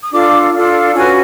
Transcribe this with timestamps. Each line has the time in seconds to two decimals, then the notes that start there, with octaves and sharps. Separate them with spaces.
0.03 D#6
0.11 D4 F4 A4 D6
0.53 D4 F4 A4
0.95 C#4 F#4 B4 G#5